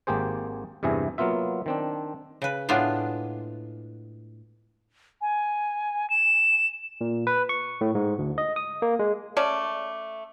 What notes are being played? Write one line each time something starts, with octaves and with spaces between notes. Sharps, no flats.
G#1 A#3 G4 G#4 C5
E2 G2 C3 E4 G#4
F#3 A#3 B3 F4 E5
D#3 C4 D4
C#3 B4
A2 G#3 B3 D4 F4
G#5
E7
A#2
B4
C#6
A2
G#2
D2
D#5
D#6
A#3
G#3
A3 C#4 D5 A5